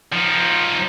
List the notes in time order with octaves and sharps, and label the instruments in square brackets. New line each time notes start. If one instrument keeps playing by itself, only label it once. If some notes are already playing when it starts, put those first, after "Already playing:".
[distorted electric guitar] F3 D#4